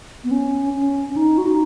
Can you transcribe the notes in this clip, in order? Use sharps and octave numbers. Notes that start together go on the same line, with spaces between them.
B3
C#4
C#4
C#4
D#4
F#4
D#4